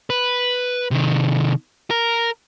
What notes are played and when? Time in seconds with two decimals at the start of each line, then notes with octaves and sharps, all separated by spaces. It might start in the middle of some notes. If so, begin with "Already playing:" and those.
0.10 B4
0.91 C3 D#3
1.90 A#4